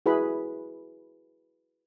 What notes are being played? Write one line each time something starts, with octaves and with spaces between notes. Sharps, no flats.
E4 F#4 G#4 B4 B5